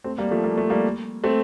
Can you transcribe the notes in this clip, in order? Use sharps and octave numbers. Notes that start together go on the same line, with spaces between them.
A3 C4
G3 A#3
F3 A3
A#3
A3
G3 A#3
A3 C4